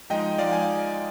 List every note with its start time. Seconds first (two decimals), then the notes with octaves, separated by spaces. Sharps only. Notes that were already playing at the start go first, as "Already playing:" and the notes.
0.10 F3 G#3 D#4 D#5 G5
0.38 F3 G#3 D#4 D5 F5
0.52 F5 G#5